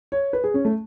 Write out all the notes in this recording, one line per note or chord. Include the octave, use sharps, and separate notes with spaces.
C#5
B4
G#4
C#4
A3